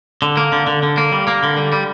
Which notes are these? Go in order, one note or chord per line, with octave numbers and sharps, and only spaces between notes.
D3
A#3
D3
D3
D3
A#3
G3
A#3
D3
G3
G3